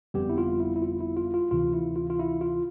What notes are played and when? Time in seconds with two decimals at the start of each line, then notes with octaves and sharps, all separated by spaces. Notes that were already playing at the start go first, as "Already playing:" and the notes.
0.14 G1 F2 D3 G3 B3 G4
0.29 E4
0.38 F4
0.60 E4
0.76 E4
0.82 F4
1.00 E4
1.17 F4
1.34 F4
1.51 D2 C3 E3 F4
1.74 E4
1.96 F4
2.10 F4
2.19 E4
2.41 F4